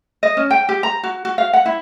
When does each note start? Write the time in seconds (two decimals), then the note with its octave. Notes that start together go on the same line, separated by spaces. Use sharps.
0.23 D#5
0.37 C#4
0.51 G5
0.69 G4
0.83 A#5
1.03 F#4
1.25 F#4
1.38 F5
1.53 F#5
1.66 E4